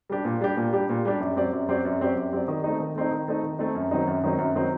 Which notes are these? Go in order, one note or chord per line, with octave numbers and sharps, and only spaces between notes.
G3 D4 G4
A#2
G3 D4 G4
A#2
G3 D4 G4
A#2
G3 D4 G4
F#2
F#3 C4 G4 D5
F#2
F#3 C4 G4 D5
F#2
F#3 C4 G4 D5
F#2
F#3 C4 G4 D5
D#3
A3 C4 D#4
D#3
A3 C4 D#4
D#3
A3 C4 D#4
D#3
A3 C4 D#4
F#2
D#3 F#3 C4 D#4
F#2
D#3 F#3 C4 D#4
F#2
D#3 F#3 C4 D#4